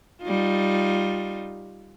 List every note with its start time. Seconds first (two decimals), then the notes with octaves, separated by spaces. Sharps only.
0.22 G3 D#4 F4